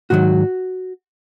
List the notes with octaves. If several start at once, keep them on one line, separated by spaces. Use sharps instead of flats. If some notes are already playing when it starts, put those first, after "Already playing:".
G#2 D#3 F#3 F#4